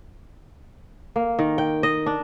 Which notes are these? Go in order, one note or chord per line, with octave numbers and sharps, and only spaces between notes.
A#3
D#3
G5
D#5
D4